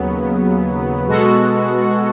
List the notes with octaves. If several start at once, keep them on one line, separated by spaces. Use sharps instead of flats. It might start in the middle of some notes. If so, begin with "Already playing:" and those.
Already playing: D#2 C#3 F#3 B3
B2 G#3 B3 F#4 A4